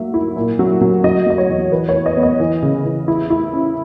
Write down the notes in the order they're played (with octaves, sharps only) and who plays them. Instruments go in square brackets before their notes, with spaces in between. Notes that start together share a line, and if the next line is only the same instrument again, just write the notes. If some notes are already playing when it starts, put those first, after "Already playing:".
Already playing: [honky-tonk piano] G#2 F#3 A#3 E5
E4
A#2
F#3
F#3
F#3 D#5
F#3 D#5
C#5
E2
E3 B4
C#5
E3
D#5
B3
D#5
E3
C#3
E3
E4
E4
C#4